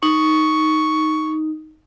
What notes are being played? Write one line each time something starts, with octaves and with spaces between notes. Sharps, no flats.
D#4 C#6